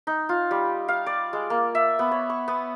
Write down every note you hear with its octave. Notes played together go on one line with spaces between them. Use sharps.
D#4
F4
G3
F5
D5
G#3
A#3
E5
B3
C#5
C#6
B3